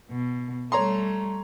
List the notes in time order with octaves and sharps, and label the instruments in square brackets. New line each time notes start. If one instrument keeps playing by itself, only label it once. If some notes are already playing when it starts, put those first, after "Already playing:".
[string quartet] B2
[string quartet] G3 A3 [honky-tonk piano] C#5 A#5 C6